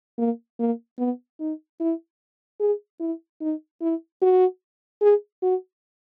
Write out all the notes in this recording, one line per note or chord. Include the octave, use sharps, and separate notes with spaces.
A#3
A#3
B3
D#4
E4
G#4
E4
D#4
E4
F#4
G#4
F#4